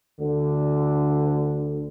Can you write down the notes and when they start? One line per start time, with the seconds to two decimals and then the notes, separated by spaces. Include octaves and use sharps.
0.21 D2 D3